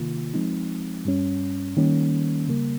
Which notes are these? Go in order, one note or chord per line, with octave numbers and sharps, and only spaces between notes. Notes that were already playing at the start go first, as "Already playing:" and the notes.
Already playing: C3 D#3 A#3 F4
F3 G#3 C4 D#4
G2 G3 C#4
D#3 G3 A#3 C#4
C#3 G3 A#3